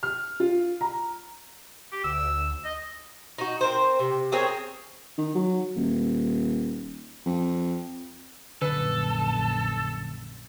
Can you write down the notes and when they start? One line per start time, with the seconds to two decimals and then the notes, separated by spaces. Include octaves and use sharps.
0.03 F6
0.40 F4
0.81 A#5
1.92 G4
2.04 D2 E6
2.65 D#5
3.38 D#4 F#4
3.61 C4 A#4 C5
3.99 C3
4.32 C4 G#4 A#4 C#5
5.18 D#3
5.35 F#3
5.76 D#1
7.26 F2
8.62 A#1 F#2 D3 A4 B4